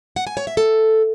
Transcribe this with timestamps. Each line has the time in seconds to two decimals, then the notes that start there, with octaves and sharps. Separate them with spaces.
0.16 F#5
0.27 G#5
0.37 C#5
0.47 E5
0.57 A4